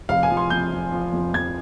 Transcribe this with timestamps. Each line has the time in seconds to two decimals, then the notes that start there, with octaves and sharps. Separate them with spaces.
0.09 F1 F5
0.23 G#5
0.30 F3
0.37 C6
0.50 F2 G6
0.72 F3
0.92 F3
1.13 F2
1.34 F2 G#6